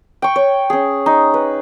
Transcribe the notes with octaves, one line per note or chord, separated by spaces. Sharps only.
G5 C#6
C#5
C#4 G#4
D#4
B4